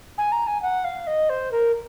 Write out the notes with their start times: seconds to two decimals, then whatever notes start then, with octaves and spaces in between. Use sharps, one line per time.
0.18 G#5
0.32 A#5
0.47 G#5
0.62 F#5
0.84 F5
1.07 D#5
1.29 C5
1.51 A#4